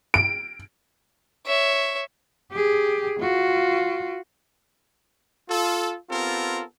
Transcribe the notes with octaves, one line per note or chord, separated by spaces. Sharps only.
D7
C#5 E5
G4 G#4
F4 F#4
F4 A4
B3 C4 F4 G4 A4 A#4